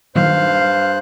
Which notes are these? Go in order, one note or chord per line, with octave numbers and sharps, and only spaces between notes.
G2 A#2 D#3 F#3 C5 F5 F#6